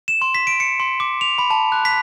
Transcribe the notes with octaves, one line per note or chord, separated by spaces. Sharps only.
E7
C6
B6
D7
C#7
C6
D6
F7
B5
A5
F#6
B6